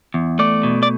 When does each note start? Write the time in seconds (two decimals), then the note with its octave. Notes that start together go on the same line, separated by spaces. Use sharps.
0.14 E2
0.39 A3 D5
0.63 B2
0.83 D5